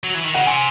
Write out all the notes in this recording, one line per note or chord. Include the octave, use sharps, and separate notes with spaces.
F#3
E3
D#3
C#3 F#5
C3 G#5